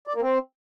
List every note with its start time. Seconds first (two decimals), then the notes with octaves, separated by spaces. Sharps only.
0.07 D5
0.14 A#3
0.22 C4